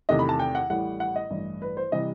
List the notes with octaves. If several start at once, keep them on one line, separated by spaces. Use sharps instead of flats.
E2 C3 D#3 A3 D#5
B5
A5
G5
F#5
A1 A2 G3 F#5
F#5
D#5
A1 G2 E3
B4
C5
C3 E3 G3 D#5